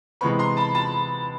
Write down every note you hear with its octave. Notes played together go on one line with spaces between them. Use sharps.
C3 E3 G#3 B3 B5 C#6
A#5 C6
A5 B5
A5 B5